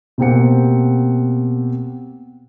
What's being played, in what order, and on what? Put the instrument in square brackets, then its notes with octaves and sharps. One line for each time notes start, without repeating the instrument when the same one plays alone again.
[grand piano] B2 A#3 C4 G4 F#5 C#7